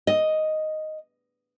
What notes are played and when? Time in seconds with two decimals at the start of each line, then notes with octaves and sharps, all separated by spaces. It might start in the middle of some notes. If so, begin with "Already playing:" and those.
0.07 D#5